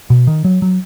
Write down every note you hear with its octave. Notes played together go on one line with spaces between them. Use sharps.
B2
D#3
F#3
F#3